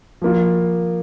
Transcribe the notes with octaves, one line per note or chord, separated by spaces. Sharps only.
F3 A#3 F4